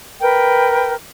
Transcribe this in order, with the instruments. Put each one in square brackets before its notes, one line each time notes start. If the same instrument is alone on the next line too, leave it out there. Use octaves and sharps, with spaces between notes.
[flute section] A#4 B4 G5